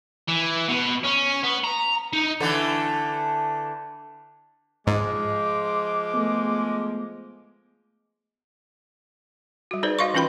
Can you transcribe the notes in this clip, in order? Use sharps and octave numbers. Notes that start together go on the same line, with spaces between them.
E3
B2
C#4
B3
A#5
D#4
D3 E3 A3
G#2 F3 G#3 D6
A3 B3
G3 F#4
D#4 G#4 B4 C5 D5
F#4 D#5 F5 C6 C#6
E3 C#4 F4 B4 G5 B5